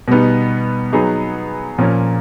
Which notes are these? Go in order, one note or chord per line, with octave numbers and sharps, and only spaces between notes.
B2 G3 B3 D#4
F#3 B3 D#4 G#4
A#2 F3 A#3 C#4